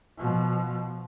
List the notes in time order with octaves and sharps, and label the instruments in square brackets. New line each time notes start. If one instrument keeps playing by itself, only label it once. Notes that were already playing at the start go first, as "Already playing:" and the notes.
[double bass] B2 F3